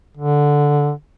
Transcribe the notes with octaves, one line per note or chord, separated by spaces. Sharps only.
D3